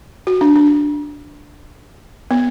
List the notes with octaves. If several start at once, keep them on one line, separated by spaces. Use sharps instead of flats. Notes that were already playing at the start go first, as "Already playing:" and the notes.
F#4
D4
D4
B3